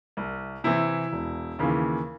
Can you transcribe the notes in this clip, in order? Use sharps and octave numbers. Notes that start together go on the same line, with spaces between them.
C2
C3 E3 E4
E1
D#2 C#3 E3